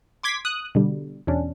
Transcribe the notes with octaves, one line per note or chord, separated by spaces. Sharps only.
C6 D6 G#6 B6
D#6 F#6
B2 D3 G3
E2 B2 C#4 D4